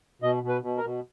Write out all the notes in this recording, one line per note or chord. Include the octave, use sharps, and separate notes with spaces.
B2 D#5
B2
B4
B2
A#4
B2